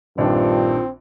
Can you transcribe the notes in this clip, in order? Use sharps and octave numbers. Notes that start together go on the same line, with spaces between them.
A#1 G2 D#3 C4 D4 F4